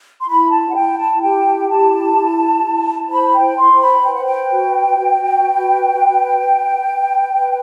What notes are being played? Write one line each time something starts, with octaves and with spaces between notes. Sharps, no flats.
C6
E4 B5
A5
F#5
E4 G5
A5
G4 G5
E4 A5
E4
E4
C5 B5
G5
C5 C6
B5
B4 G5
F#5
G5
F#4
F#4
B4
B4
B4
B4
B4